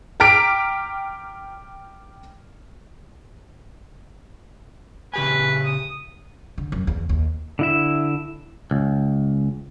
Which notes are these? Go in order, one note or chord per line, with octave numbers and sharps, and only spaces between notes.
G5 A#5 D6 F6 B6 D7
C#3 G4 B4 G#5
D#6
D3
F#2
E2
D#2
D3 E4 E5
C#2